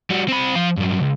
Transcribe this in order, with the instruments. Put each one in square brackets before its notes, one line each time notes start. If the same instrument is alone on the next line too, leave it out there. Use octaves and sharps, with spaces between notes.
[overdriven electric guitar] G3 F#4
C4 B5
F3 F5
G2 F#3
C#2